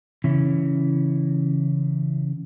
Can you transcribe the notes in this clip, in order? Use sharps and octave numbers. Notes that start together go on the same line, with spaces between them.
C#3 E3 C#4 E4